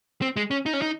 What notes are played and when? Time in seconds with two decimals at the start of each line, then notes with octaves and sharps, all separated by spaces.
0.22 C4
0.36 G#3
0.51 C#4
0.66 D#4
0.73 C#4
0.82 D#4